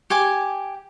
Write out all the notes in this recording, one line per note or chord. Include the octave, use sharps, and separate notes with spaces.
G4 G#5 D6